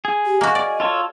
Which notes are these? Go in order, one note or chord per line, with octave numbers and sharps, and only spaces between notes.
G#4
G4
A#3 F#4 D#5
D5
F4 A4 C#5